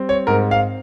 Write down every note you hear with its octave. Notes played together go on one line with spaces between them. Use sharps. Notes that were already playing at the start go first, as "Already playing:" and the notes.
Already playing: G3 C4
C#5
G#2 A#4
F5